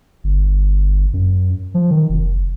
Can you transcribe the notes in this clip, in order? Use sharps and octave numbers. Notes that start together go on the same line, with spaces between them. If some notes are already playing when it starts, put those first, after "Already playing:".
G1
F#2
F3
D#3
F1